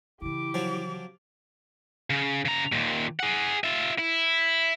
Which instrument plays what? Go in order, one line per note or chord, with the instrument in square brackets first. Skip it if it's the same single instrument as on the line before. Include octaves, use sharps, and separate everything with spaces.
[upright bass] C#3 E3 [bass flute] E4 [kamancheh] G4 D6
[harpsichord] F3 F#3
[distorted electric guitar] C#3
C#3 A#5
D#2 A#2
G#4 F#5
F4 E5
E4